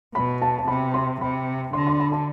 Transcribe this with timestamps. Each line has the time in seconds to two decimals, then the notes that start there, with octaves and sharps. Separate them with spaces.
0.15 B2 B5
0.42 A5
0.58 A5
0.68 C3 B5
0.94 C6
1.21 C3 B5
1.73 D3 C6
1.87 C6
1.99 B5
2.12 A5